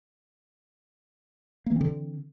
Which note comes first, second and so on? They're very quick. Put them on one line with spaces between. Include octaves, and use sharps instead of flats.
A#3 E3 C4 D3